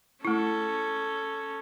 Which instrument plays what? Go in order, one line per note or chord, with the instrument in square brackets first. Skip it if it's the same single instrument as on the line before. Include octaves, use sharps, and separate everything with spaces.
[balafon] A3 E4 [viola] C#4 A4